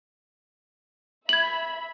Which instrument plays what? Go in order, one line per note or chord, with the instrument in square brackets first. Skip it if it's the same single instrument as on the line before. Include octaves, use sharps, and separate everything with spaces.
[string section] E5 B5 [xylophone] G#6 F#7